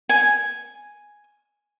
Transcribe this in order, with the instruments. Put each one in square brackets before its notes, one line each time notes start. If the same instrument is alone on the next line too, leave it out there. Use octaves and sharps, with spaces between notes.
[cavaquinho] G#5